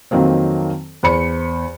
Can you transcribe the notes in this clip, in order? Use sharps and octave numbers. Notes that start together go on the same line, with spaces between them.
F2 D#3 F#3 A#3 C4
E2 C5 B5 C#7